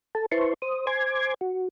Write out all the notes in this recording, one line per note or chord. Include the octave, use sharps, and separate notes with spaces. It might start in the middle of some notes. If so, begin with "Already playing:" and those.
A4 A5
E4 B4 C5 A5 C6 C#6
C5 D#6
C5 G#5 C6 D6 G#6
F#4